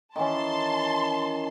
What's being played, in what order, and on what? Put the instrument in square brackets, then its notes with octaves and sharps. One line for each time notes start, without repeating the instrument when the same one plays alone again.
[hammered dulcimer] D#3 E3 C#4 [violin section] A5 C6